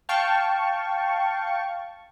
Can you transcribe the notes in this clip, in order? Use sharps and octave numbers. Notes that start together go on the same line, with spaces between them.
F5 G5 A5 C#6